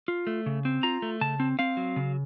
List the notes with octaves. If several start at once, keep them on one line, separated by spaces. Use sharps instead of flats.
F4
A3
C#3
C4
F4 A#5
A3
C#3 A5
C4
C4 F5
F#3
C#3